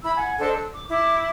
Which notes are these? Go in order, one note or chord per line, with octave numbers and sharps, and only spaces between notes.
E4 B5 E6
F#5 G#5
D4 A4 C5 D#5
E6
D6
E4 D6